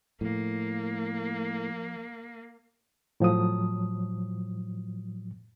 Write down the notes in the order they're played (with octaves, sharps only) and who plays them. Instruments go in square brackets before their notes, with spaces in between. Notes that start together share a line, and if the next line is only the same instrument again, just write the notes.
[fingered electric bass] A2 [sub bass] F3 [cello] A#3
[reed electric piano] A2 F3 F#3 D#6